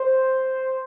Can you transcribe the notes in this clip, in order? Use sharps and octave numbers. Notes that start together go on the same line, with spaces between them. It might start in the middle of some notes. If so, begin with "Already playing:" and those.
Already playing: C5